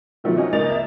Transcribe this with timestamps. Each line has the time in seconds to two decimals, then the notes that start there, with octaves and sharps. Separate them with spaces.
0.24 B2 D#3 F3 F#3 A3
0.37 C#4 D#4 F#4
0.52 C#2 A#3 D#4 A6 F7
0.70 E5